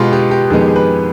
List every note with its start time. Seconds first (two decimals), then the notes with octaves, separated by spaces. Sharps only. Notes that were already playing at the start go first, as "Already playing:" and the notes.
Already playing: B2 G#3 B3 F4 G4
0.13 G4
0.31 G4
0.50 F2 D#3 G#3 B3 G#4
0.61 G4
0.68 G#4
0.76 B4